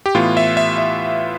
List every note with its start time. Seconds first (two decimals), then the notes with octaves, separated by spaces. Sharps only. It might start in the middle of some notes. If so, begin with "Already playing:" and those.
0.06 G4
0.15 A2 E3 B3 F4
0.37 E5
0.57 E5
0.78 E5